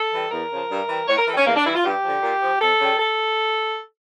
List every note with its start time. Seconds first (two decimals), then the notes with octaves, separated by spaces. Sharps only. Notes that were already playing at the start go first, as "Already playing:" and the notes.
Already playing: A4
0.12 E3 G3
0.31 E2 A#4
0.50 C#3 F3
0.70 G2
0.89 E3 G3
1.08 A2 C#5
1.17 A#4
1.27 E3 G3 A4
1.37 C#4
1.46 E2 A#3
1.56 D4
1.65 E3 G3 E4
1.74 F4
1.84 G2 G4
2.03 D3 F3
2.22 A#2
2.41 F3
2.61 F2 A4
2.80 C#3 G3
2.99 A4